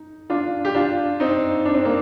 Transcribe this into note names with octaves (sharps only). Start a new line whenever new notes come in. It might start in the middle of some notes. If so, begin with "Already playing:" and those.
Already playing: D#4
D4 F4
G4
D4 F4
C4 D#4
D4
C4
A#3